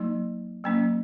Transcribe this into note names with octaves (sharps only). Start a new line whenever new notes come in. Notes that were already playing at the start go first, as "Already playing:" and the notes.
Already playing: F#3 A#3 D#4
F#3 A#3 C#4